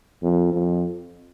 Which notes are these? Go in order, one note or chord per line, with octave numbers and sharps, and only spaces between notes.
F2
F2